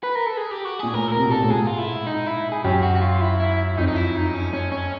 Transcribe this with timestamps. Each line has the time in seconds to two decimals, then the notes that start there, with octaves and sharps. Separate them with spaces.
0.03 B4
0.15 A#4
0.26 A4
0.37 G#4
0.51 G4
0.65 F#4
0.79 A#2 G#4
0.94 A2 A#4
1.08 A4
1.12 C3 A#4
1.26 B2
1.31 A#2 A4
1.42 A2
1.50 G#2 G#4
1.67 F4
1.79 E4
2.07 D#4
2.27 E4
2.52 G#4
2.64 F#2 G4
2.83 F#4
2.96 F#4
3.01 F4
3.21 E4
3.40 E4
3.77 F2 D#4
3.88 D#4
3.96 E4
4.15 D#4
4.34 C#4
4.53 C#4
4.72 C#4